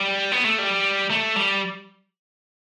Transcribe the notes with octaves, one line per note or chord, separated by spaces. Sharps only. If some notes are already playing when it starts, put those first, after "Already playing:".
Already playing: G3
B3
A3
G3
A3
G3